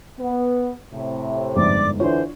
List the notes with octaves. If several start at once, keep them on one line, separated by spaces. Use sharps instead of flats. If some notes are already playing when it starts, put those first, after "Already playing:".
B3
A2 C3
G1 F2 G#2 D5 D6
D3 E3 D4 F4 C5 C#5